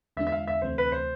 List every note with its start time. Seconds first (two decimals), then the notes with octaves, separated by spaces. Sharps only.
0.17 E2 D3 G#3 D4 F4 E5
0.27 E5
0.32 F5
0.47 E5
0.62 D2 C3 E3 A3 C5
0.78 B4
0.92 C5